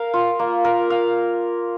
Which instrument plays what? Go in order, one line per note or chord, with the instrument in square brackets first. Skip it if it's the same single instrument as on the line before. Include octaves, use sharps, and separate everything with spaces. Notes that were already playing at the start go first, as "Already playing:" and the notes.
Already playing: [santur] A#4 F5
F4
A#3
A#4
F5